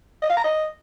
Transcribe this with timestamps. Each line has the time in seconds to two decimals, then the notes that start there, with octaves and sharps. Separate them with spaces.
0.22 D#5
0.30 F5
0.37 A#5
0.44 D#5